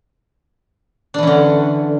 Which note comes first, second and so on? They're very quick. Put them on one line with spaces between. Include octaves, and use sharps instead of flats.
D4 E3 C#4 D3